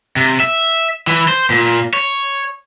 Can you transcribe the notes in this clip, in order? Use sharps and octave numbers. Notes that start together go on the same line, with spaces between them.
C3
E5
E3
C5
A#2
C#5